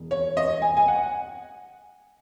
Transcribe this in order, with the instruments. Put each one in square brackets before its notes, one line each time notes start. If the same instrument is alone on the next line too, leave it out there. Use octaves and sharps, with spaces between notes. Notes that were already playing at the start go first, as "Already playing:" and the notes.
Already playing: [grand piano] E1
C#5
D#5
G#5
G#5
F#5